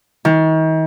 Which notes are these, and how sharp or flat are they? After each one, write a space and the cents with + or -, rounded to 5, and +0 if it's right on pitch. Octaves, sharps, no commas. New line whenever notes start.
D#3 +40